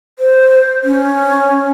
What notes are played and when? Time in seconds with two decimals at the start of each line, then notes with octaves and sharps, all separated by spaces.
0.19 C5
0.84 C#4